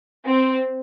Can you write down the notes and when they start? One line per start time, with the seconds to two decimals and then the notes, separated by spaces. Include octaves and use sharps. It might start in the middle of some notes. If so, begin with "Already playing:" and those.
0.24 C4